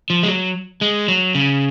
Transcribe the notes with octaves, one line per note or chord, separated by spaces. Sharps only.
F3
G#3
F#3
G#3
F#3
C#3